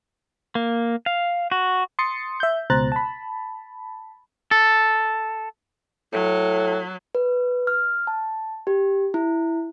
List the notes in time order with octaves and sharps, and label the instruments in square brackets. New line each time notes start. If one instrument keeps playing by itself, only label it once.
[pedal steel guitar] A#3
F5
F#4
[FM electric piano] C6 D#6 A6 C#7
E5 G6
C#2 B2 C5 A#5 F#6 A6
A5 B5
[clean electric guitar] A4
[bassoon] A2 [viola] F#3
[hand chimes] B4
F6
A5
G4
E4